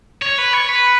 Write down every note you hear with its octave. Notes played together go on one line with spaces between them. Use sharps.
C#5
B4
C#5
B4